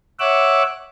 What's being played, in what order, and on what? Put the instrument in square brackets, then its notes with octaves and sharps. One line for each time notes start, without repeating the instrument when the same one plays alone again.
[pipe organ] C#5 E5 F#5 D6 E6 F#6